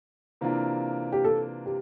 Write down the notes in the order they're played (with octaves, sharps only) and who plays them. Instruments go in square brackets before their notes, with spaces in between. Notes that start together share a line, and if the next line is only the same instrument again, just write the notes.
[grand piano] C3 E3 A#3 D4 F4
[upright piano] G4
A4
G4